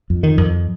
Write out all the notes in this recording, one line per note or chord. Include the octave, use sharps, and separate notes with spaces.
F2
D#3
F2